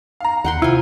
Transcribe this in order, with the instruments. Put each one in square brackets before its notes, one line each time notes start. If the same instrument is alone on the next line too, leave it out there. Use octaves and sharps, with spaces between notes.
[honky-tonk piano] F5 A#5
[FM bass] D#2 [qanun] F#5 G5 C6
[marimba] C3 [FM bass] E4 [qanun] F4 G#5